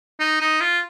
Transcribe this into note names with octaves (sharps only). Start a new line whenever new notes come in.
D#4
D#4
F4